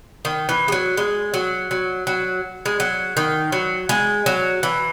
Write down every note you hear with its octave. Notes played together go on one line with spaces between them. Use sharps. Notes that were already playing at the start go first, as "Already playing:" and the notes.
D#3
E3
G#3
F#3
G#3
F#3
F#3
F#3
G#3
F#3
D#3
F#3
G#3
F#3
E3